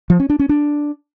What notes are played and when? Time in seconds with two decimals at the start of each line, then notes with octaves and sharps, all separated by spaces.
0.10 F3
0.20 C#4
0.30 D4
0.39 C#4
0.49 D4